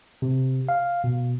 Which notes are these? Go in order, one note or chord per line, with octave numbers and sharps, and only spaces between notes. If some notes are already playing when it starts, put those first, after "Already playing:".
C3
F5
B2